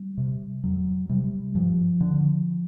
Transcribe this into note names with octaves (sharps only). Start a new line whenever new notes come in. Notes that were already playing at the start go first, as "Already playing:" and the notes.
Already playing: G3
C3
F2 F#3
C3 G3
G2 F3
D3